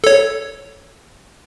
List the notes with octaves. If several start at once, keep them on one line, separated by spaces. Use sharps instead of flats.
A4 C#5